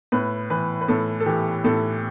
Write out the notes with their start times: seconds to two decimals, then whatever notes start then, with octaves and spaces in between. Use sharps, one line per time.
0.12 A2 B4
0.50 E3 B4
0.81 B4
0.88 A2 A4
1.20 A4
1.26 E3 G4
1.64 A2 A4